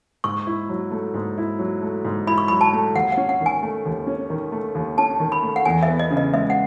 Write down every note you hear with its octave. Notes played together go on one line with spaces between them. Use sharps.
G#2 C#6
E4
F#3
A3
G#2
E4
F#3
A3
G#2
E4 B5
C#6
F#3 B5
A5
A3
D#2 F#5
F#5
C#4
F#5
D#3
G#5
A3
D#2
C#4
D#3
A3
D#2
C#4 A5
D#3
B5
A3
F#5
E2 G#5
E5
B3
D#5
C#3
D#5
G#3 E5
F#5